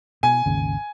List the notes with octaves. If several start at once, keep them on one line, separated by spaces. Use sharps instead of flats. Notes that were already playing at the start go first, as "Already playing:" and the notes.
B2 G#5
G#1 D#2 C#3